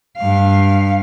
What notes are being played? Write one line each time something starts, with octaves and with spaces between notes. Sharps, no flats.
G2 F5